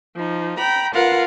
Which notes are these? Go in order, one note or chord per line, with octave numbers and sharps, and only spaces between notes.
F3 D#4
G5 A#5 B5
F4 A#4 B4 F5 F#5